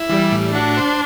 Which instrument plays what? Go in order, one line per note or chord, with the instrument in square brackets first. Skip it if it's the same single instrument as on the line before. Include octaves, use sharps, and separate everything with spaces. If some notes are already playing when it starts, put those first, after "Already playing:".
Already playing: [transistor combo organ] E4
[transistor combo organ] E3 [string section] G3
[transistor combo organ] A2
[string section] D4 [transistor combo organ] F#4
[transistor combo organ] C5